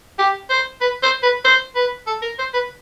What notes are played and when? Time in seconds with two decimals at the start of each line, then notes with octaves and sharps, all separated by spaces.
0.19 G4
0.50 C5
0.81 B4
1.03 C5
1.23 B4
1.45 C5
1.75 B4
2.07 A4
2.22 A#4
2.39 C5
2.54 B4